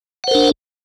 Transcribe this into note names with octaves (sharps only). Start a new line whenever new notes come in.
D4 A#4 C5 F#5